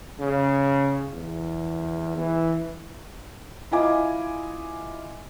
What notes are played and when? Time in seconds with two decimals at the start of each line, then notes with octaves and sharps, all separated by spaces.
0.20 C#3
1.14 E2
2.17 E3
3.72 E4 F4 D#5 G#5 D6